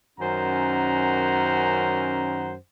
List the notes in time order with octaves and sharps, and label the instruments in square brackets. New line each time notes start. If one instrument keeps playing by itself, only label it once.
[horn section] F#2 D#3 C#4 C5 F#5 A#5